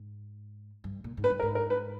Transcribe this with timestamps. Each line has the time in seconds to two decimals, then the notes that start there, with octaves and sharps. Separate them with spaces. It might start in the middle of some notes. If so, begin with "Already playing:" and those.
Already playing: G#2
0.84 G2
1.04 A#2
1.17 G#2
1.24 B4
1.30 G2
1.40 A#4
1.42 G#2
1.55 A#4
1.70 B4